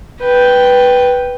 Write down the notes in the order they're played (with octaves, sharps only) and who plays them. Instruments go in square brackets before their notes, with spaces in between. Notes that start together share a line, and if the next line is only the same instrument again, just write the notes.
[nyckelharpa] B4 G5